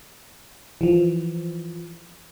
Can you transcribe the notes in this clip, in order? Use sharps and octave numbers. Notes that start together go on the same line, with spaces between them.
E3 F3